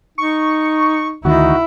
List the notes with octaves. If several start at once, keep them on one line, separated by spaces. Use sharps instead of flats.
D#4 C#6
D2 D#3 D#4 E4 F#4